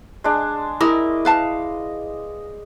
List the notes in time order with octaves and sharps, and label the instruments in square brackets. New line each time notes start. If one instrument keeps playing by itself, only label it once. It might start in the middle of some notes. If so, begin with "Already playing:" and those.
[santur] G#3 D4
[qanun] E4 [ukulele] A#4 [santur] D#5 D6
[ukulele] B4 F5 A5